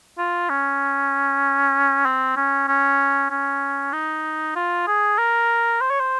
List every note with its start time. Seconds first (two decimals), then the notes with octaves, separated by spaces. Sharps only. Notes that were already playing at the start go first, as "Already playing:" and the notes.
0.18 F4
0.50 C#4
2.06 C4
2.37 C#4
2.68 C#4
3.30 C#4
3.93 D#4
4.56 F4
4.88 G#4
5.18 A#4
5.81 C5
5.90 C#5
6.01 C5